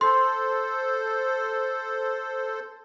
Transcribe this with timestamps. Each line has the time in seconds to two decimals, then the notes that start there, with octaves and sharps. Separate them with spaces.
0.01 A4 C5 C6